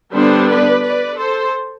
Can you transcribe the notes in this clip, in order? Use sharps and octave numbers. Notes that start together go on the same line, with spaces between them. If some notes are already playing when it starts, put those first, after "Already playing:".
D3 G3 B3 D4 A4 C5
B4 D5
B4 D5
A4 C5